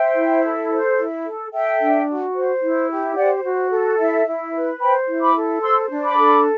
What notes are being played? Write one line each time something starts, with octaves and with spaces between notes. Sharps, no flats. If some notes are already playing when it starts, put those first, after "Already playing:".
Already playing: C5 E5 G5
E4
A4
C5
E4
A4
A4 E5 G5
D4
F#4
C5
E4
G4
C5 D5 F#5
F#4
A4
E4 E5
E4
B4
C5 G5 B5
E4
B5 D6
A4
C5 C6 E6
D4
B5 D6
A4